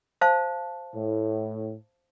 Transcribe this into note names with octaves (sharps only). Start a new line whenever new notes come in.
C5 F5 A5
A2